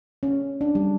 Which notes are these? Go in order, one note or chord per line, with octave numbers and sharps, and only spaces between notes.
C#4
D4
G3